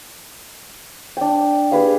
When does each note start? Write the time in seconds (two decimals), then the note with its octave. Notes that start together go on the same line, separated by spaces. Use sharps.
1.17 D4 G5
1.72 G4 G#4 B4 F5